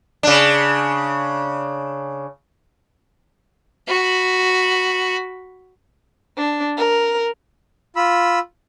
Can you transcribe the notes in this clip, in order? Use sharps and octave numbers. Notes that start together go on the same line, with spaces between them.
C#3 D4
F#4 B5
D4
A#4
F4 B5 E6